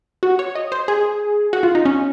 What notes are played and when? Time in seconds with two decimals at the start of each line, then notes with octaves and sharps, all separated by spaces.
0.23 F#4
0.39 C#5
0.55 D#5
0.72 C5
0.88 G#4
1.53 F#4
1.63 F4
1.75 D#4
1.85 C#4